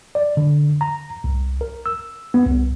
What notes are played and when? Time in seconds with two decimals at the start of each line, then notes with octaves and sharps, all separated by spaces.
0.15 D5
0.37 D3
0.81 A#5
1.24 C2
1.61 A#4
1.86 E6
2.34 B3
2.47 C2